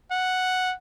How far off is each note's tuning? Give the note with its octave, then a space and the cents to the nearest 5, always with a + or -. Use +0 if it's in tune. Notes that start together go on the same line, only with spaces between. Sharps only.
F#5 -5